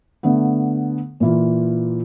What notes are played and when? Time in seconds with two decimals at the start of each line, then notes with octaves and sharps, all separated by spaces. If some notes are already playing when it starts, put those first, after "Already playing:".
0.23 D3 A3 B3
1.20 A#2 E3 F4